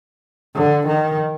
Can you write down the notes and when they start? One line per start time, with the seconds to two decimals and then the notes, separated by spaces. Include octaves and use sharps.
0.55 D3
0.87 D#3